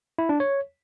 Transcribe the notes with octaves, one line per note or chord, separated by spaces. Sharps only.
E4
D4
C#5